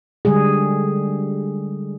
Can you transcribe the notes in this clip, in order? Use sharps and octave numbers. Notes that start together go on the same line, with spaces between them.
D3 G3 G#3 G#4